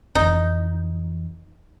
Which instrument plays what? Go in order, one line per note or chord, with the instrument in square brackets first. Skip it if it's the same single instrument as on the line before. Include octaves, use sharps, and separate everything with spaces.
[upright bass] F2 E3 [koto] D#4